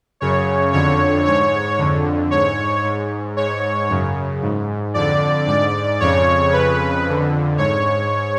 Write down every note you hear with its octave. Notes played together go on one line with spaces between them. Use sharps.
F#2 C#3 C#5
F2 D3 C#5
G#2 C#5
F2 D3
G#2 C#5
G#2
G#2 C#5
F#2 C#3
G#2
F2 D3 D5
G#2 D5
F2 C#3 C#5
F2 C#3 B4
F2 D3
G#2 C#5